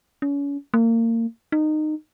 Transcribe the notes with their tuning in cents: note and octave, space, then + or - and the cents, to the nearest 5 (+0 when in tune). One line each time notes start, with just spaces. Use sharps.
C#4 +35
A#3 -30
D#4 -20